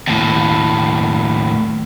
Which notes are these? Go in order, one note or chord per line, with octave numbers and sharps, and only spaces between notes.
D#2 A2